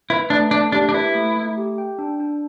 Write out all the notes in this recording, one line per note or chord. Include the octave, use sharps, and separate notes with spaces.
E4 B4
A3 D4
A3 D4
D4 G4
D4
E4 B4
A3
A3
G4
G5
D4
D4